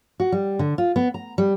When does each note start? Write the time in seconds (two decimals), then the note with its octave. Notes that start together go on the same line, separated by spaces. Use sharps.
0.20 F#4
0.32 G3
0.59 D3
0.78 F4
0.96 B3
1.14 A#5
1.38 G3